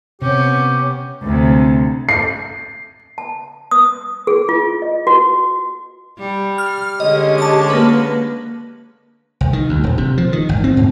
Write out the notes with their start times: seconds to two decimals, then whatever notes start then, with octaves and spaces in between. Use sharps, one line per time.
0.22 C3 B3 C#4 G4
1.23 D2 C3
2.09 C7
3.18 A5
3.71 D#6
4.27 G#4
4.49 F4
4.82 D#5
5.07 F#4
6.19 G3
6.58 F6
7.00 D3 G#3 C#4 G4 D#5
7.38 A5 D6
7.70 A#3 B4
9.41 C2
9.53 D#3
9.69 D2
9.84 D#1
9.98 C3
10.18 F3
10.33 D#3
10.49 G#1
10.64 C4
10.77 G#2